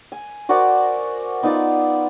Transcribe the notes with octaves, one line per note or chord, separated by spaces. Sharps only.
G#5
F#4 A#4 C5 D5
B3 D#4 F4 D5